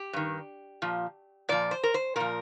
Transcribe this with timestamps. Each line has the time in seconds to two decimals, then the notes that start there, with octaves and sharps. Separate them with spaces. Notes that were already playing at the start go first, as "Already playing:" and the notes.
Already playing: G4
0.13 G2 D#3
0.82 A#2 F3
1.49 A#2 F3 D5
1.71 C5
1.83 A#4
1.94 C5
2.16 A#2 F3 A#4